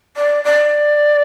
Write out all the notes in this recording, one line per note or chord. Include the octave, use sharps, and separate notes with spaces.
D5
D5